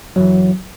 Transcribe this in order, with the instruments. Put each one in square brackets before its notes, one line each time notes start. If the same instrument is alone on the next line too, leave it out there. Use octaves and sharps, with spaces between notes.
[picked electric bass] F#1 F#2 E3 [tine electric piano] F#3